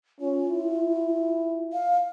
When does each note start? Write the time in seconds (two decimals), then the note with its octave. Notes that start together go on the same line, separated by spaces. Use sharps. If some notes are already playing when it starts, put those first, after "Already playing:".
0.21 C#4 F4
0.49 E4
1.73 F5